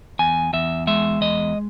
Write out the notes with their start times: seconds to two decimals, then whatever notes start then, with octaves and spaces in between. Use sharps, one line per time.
0.19 E2 G#5
0.53 E2 E5
0.87 G#3 E5
1.21 E2 D#5